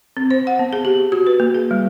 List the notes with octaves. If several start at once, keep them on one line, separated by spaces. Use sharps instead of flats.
C4
C5
F#5
B3
G#4
G4
F#4
B4
A#3
G#4
G3